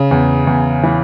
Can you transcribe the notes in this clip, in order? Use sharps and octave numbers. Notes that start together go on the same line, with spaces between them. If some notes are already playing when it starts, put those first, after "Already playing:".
Already playing: C#3
E2
E2
E3